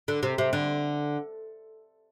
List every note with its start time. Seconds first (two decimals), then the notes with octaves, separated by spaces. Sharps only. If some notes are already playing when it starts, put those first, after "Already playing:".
0.08 D3
0.23 C3
0.38 C3
0.53 D3